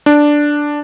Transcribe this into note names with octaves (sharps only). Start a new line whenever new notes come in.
D4